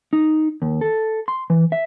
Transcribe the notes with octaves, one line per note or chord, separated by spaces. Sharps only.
D#4
D#2
A4
C6
E3
E5